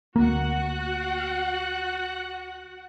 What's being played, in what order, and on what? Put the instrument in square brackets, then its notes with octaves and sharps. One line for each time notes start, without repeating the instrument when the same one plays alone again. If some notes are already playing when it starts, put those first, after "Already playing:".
[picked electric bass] D2 A#3 [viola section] F#4 F#5